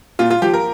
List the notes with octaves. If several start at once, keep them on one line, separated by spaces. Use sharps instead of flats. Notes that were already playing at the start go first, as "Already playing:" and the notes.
A#2 F4
F4
F3 G4
A#4